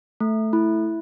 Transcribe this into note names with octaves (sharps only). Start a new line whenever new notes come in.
A3
E4